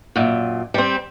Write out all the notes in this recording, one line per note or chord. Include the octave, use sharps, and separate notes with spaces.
F#2 A#2
G3 C4